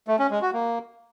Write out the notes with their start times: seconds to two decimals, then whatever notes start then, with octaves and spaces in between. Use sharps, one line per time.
0.08 A3
0.19 C#4
0.30 G#3
0.42 F#4
0.53 A#3